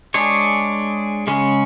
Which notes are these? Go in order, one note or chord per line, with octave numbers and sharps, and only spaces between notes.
G#3 D4 G#4 C#5
C#3 G#3 C#4